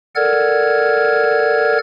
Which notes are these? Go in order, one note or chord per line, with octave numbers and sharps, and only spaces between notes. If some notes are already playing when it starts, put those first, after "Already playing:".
A4 A#4 D5 F#5 F6 G#6